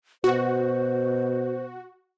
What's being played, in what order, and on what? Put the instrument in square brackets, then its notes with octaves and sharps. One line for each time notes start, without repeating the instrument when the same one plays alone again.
[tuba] B2 [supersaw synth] F#4 [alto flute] C5